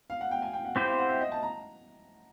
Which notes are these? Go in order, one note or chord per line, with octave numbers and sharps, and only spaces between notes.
F5
F#5
G5
G#5
G5
F#5
C4 E4 G4 C5
F5
F#5
E5
D#5
A5
A#5